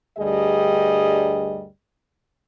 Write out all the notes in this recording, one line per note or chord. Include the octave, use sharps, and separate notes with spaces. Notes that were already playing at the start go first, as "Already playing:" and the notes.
D2 G2 G3 G4 G#4 D#5